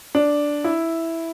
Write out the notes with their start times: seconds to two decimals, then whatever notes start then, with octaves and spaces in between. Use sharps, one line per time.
0.15 D4
0.64 E4